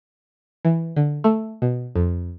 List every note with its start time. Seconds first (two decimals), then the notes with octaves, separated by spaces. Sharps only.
0.65 E3
0.96 D3
1.24 A3
1.62 B2
1.96 F2